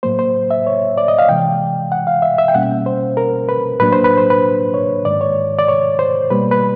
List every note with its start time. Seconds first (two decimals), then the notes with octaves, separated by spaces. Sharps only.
0.03 A2 F#3 A#3 C5
0.19 C5
0.51 E5
0.67 C#5
0.98 D5
1.08 D#5
1.19 F5
1.29 C3 E3 G#3 G5
1.92 F#5
2.07 F5
2.22 E5
2.38 E5
2.48 G5
2.54 B2 G3 A#3 C#4 F#5
2.86 C5
3.17 A#4
3.49 B4
3.79 A2 F#3 A#3 D4 B4
3.92 C5
4.04 B4
4.17 C5
4.30 B4
4.74 C#5
5.05 G#2 D#3 G#3 D5
5.21 C#5
5.59 D5
5.68 C#5
5.99 C5
6.31 B2 G3 A#3 B4
6.51 B4